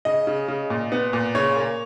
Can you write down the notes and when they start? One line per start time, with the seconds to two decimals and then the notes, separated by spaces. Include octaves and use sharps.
0.05 C#3 D#5
0.27 C#3
0.48 C#3
0.70 A#2
0.92 B3
1.13 A#2
1.35 C#3 C#5
1.56 A#3